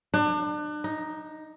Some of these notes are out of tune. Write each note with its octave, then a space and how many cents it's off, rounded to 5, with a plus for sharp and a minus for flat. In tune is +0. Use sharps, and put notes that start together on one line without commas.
D4 +35
D#4 +5